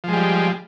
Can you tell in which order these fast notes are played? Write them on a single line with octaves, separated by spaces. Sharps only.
F3 G#3 G3